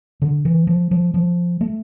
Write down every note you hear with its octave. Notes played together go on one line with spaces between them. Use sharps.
D3
E3
F3
F3
F3
A3